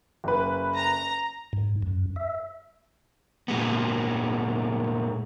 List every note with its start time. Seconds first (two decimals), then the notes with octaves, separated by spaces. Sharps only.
0.24 F#1 B4
0.76 A#5
1.53 G#2
1.82 F#2
2.16 E5
3.48 A#2 G#3 B3